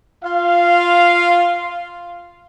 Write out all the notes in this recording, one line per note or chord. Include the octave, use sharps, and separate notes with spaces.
F4 F5